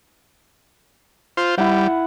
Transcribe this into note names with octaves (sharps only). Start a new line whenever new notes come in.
F4 C5
G3 E4 F#5